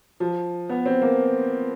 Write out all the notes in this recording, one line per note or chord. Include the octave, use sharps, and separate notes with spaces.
F3
B3
C4
A#3